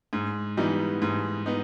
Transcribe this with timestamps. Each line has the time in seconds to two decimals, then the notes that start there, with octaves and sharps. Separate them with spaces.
0.13 G#2
0.57 E3 G3 B3 D#4
1.02 G#2
1.46 B3 D#4